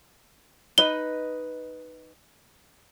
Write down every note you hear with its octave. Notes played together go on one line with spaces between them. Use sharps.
D#4 B4 D#5 G7